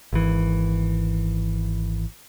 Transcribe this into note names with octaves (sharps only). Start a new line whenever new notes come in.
G#1 E3